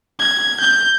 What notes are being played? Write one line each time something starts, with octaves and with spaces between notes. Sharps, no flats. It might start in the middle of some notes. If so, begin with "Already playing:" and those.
G#6
G6